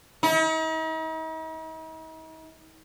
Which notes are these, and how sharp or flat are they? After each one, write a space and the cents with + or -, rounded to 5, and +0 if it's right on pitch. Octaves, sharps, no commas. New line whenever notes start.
D#4 +45